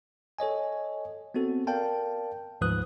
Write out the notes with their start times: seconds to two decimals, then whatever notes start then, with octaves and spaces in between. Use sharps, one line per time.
0.39 A4 C#5 D#5 G#5
1.34 B3 C4 F#4 A4
1.67 A#4 D5 F5 G5 A5
2.61 D2 G#2 F3 B4 D#6 F#6